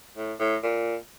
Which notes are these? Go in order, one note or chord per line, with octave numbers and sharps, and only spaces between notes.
A2
A2
A#2